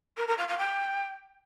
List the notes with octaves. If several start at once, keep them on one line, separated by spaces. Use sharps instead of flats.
A#4
A#4
F5
F5
G5